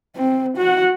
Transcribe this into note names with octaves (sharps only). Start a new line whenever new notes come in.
C4
F#4 F#5